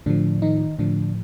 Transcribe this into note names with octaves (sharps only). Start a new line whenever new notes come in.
A2 D3 F3 D4
D#3 D#4
A2 D3 F3 D4